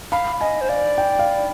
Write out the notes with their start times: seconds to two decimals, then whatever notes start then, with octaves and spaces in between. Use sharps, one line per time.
0.12 F5 B5
0.41 D#5 G#5
0.61 C5
0.69 D5 F5
0.98 G5
1.19 F5